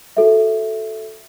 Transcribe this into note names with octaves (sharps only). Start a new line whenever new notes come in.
F#4 A4 E5